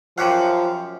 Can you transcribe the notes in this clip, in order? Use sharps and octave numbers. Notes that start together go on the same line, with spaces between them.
F#2 F3 G4 C#5 F5 F#5